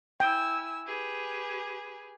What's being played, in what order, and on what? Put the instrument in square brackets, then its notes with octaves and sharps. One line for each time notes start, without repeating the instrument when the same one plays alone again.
[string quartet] E4 G#5 E6 [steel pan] G5
[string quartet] G4 G#4 B4